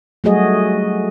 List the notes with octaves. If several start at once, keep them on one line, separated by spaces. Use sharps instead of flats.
F#3 G3 A3 F#4 G#4 D#5